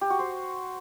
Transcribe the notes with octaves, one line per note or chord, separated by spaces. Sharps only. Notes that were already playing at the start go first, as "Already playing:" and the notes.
G4
F#4
C5